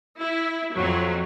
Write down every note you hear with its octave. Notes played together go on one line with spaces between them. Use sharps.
E4
F2 F#3